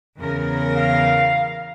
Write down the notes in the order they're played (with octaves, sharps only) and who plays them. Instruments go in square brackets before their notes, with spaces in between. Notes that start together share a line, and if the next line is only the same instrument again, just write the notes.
[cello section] E2 C#3 A#4
[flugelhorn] F5